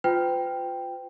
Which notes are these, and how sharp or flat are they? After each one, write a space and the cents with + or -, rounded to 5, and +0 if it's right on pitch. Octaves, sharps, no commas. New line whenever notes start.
F4 +10 B4 +45 G5 +0